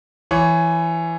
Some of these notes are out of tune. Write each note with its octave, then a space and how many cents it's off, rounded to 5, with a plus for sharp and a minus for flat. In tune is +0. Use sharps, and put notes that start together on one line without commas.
E3 +15 C#5 +0